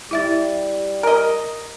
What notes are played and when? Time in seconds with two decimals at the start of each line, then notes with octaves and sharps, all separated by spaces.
0.11 G3 E4 E5 A6
1.03 A#4 D#5